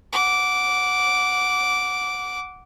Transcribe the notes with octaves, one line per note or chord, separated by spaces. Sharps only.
F#5 D6